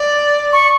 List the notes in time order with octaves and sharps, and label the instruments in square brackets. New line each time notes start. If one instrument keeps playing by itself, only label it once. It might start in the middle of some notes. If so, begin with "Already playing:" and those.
Already playing: [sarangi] D5
[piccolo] C#6